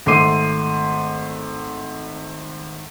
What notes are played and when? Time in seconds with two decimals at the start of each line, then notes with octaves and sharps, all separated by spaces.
0.06 G#1 A3 C6 D6 C7 D#7